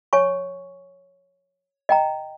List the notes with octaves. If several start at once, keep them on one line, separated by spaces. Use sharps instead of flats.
C#5 G#5 C#6
D#5 G5 A#5